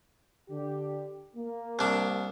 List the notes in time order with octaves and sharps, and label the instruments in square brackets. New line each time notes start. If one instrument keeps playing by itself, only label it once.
[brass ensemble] D3 G4
A#3
[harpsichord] C2 D4